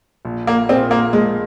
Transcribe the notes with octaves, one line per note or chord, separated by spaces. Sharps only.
A#1
A#3
A#2 A#3 C4 F4 G#4
A#3
A#1 G#3